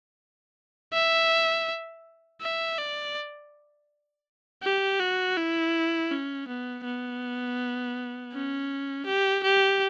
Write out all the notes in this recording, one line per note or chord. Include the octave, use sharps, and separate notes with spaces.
E5
E5
D5
G4
F#4
E4
C#4
B3
B3
C#4
G4
G4